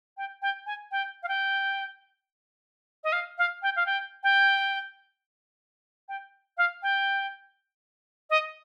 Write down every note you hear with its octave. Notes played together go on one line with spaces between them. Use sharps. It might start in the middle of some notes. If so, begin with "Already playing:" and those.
G5
G5
G#5
G5
F5
G5
D#5
F5
F5
G5
F5
G5
G5
G5
F5
G5
D#5